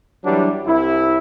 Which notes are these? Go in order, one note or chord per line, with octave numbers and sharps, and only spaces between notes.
E3 F#3 G3 D4 E4
C2 E4